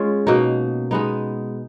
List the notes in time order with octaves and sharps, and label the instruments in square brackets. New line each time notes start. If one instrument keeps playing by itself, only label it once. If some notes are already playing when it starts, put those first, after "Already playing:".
Already playing: [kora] G#3 C#4 F4
B2 A#3 D#4
G#3 B3 D#4